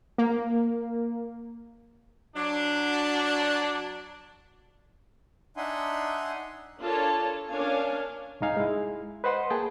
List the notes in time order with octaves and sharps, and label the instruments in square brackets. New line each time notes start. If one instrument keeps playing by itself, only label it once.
[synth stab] A#3
[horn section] F#3 D4
[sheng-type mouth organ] D4 D#4 E5 F#5 G#5 C6
[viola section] D4 F4 A4 A#4 C#5 A5
C#4 D4 A#4 C#5 F5 G#5
[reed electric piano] C2 G#2 D#4 F5 G#5
G#3 E4
B4 C5 D#5 F#5 C6
A#3 G#4 G5 A5